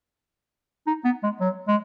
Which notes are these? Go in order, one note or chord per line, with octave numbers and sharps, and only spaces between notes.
D#4
B3
G#3
F#3
G#3